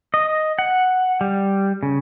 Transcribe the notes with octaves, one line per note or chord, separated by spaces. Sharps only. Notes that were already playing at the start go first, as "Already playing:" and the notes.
D#5
F#5
G3
C#3